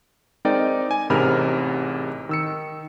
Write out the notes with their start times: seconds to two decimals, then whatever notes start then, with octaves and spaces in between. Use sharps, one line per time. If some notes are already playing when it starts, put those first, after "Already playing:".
0.45 G#3 C4 D#4 A#4 D5 G5
0.91 G#5
1.10 A1 G#2 C3 A#4 B5 F6
2.29 D#3 E6 C#7